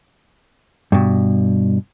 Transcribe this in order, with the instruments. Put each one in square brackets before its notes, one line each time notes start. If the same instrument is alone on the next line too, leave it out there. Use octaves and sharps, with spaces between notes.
[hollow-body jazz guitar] G2 B2